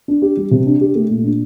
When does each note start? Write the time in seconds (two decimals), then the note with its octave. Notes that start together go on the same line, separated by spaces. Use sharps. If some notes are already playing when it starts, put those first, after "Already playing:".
0.08 D4
0.22 G4
0.37 G3
0.51 C3
0.66 D4
0.81 G4
0.95 A3
1.09 A#2
1.24 D4